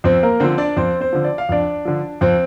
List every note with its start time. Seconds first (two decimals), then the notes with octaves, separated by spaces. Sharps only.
0.04 F2 C4 C5
0.23 A#3 A#4
0.40 D3 F3 C4 C5
0.58 D4 D5
0.77 F2 C4 C5
1.00 C4 C5
1.13 D3 F3
1.24 D5
1.38 F5
1.49 F2 D4 D5
1.85 D3 F3
2.21 F2 C4 C5